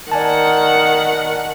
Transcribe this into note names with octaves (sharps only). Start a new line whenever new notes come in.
D#3 D5 F#5 G#5 A5